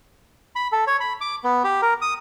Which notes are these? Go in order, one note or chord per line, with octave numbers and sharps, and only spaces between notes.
B5
A4
C#5
B5
D6
B3
G4
A#4
D#6